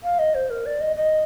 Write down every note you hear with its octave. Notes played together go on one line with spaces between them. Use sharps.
F5
D#5
C5
A#4
D5
D#5
D#5